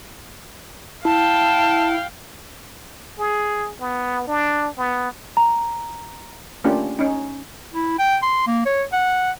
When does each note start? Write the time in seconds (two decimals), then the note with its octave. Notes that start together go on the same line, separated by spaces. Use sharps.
1.05 E4 F5 G5 A5
3.19 G#4
3.80 B3
4.27 D4
4.78 B3
5.37 A#5
6.64 A3 A#3 C#4 D4 F4 G4
6.99 C#4 D#4
7.74 E4
7.99 G5
8.22 C6
8.47 A#3
8.66 C#5
8.93 F#5